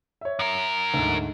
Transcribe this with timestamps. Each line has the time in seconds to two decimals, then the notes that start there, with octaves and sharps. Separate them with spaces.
0.21 C#5 E5
0.39 F#2 A#4
0.94 D2 G#2